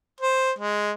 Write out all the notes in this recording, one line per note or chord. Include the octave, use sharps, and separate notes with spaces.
C5
G#3